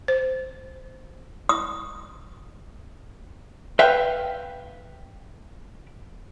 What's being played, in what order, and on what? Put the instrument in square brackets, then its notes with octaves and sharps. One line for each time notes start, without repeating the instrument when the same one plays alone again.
[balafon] C5
[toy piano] D#6
[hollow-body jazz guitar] B4 E5 F5 G5